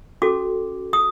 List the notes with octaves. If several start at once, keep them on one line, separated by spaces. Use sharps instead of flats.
C#4 F#4 A4 D6
D#6